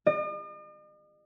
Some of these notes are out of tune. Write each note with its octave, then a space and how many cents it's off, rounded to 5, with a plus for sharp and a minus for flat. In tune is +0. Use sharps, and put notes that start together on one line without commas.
D#5 -45